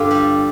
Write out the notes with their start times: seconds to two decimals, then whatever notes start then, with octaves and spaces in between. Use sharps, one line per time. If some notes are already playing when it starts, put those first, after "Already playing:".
Already playing: G2 D3 F4 G4
0.11 G3